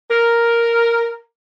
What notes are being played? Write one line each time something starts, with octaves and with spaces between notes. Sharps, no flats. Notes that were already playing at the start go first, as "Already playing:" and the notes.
A#4